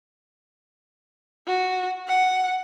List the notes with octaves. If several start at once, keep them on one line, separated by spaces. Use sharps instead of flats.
F#4
F#5